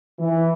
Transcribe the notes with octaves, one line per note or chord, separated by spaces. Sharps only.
E3